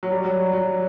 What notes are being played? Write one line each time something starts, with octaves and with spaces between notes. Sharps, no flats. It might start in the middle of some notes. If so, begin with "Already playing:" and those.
F#3
G3
F#3
F#3